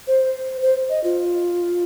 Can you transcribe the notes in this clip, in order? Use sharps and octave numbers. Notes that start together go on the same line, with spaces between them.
C5
C5
D#5
F4